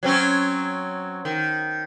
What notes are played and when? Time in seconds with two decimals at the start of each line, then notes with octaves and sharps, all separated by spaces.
0.03 F#3 C4 C#4
1.25 D#3